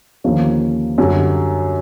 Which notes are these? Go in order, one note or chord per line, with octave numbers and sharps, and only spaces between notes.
D#2 D3 F3 A#3 C#4
F#2 D3 G3